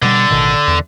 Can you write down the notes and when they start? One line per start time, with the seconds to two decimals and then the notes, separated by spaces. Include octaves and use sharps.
0.02 B2 D3 G3
0.30 A1 B2 D#3
0.68 E2